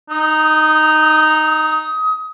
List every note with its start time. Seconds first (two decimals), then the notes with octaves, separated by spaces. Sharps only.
0.10 D#4 D#6